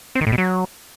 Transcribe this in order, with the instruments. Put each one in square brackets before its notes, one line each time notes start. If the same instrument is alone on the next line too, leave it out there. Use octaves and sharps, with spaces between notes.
[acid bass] C4
D#3
A2
B2
F#3